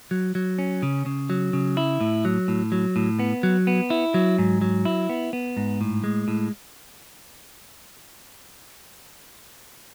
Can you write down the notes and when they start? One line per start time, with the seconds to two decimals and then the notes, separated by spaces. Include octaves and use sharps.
0.11 F#3
0.35 F#3
0.58 C#4
0.83 C#3
1.06 C#3
1.30 F#3
1.53 C#3
1.77 E4
2.01 A2
2.25 F#3
2.48 A2
2.72 F#3
2.96 A2
3.19 B3
3.43 F#3
3.67 B3
3.90 E4
4.14 F#3
4.38 G#2
4.61 F#3
4.85 E4
5.09 B3
5.33 B3
5.57 G#2
5.81 A2
6.04 G#3
6.28 A2